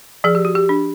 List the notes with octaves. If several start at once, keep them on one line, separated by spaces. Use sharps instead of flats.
F3 G#4
G4
F#4
G4
D4